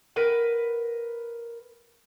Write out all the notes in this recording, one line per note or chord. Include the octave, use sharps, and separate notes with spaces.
A#4 B4 F#5